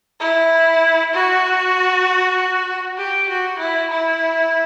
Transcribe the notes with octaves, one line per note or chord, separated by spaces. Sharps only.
E4
F#4
G4
F#4
E4
E4